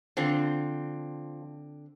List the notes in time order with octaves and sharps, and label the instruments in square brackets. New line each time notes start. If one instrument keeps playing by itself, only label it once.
[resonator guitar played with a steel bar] D3 C4 [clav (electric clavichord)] F3